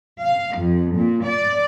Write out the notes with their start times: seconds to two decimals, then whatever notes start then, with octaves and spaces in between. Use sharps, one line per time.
0.24 F5
0.55 F2
0.95 A#2
1.25 D5